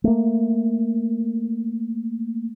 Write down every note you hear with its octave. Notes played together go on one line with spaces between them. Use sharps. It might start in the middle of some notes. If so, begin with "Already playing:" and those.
A3 A#3